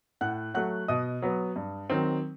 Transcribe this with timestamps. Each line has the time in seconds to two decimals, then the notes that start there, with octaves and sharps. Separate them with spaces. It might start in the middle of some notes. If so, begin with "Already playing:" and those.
0.21 A2 F#5 F#6
0.54 F#3 A3 F#5 F#6
0.88 B2 D#5 D#6
1.22 F#3 B3
1.56 G2
1.90 D#3 F#3 C4